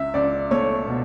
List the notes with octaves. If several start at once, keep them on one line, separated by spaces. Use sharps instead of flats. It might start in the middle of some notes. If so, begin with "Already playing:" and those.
Already playing: C#2 E5
C#2 D5
A3 C#5
B2